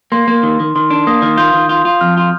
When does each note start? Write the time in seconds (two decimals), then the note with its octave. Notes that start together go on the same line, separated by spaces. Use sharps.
0.12 A#3 C6
0.28 A#3
0.43 D#3
0.60 D#3
0.76 D#3 C6
0.91 D4
1.07 A#3 D#6
1.22 D#3
1.38 F4 G6
1.54 D#3
1.69 F4
1.85 F4
2.01 F2 F6
2.17 F4